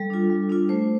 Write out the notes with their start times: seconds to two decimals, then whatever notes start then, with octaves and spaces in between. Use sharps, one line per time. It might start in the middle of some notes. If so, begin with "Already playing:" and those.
Already playing: G3 A4
0.10 D4 F4
0.30 G3
0.50 D4 F4
0.69 A3 C5